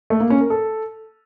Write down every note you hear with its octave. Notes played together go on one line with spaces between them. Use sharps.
A3
A#3
C#4
A#4
A4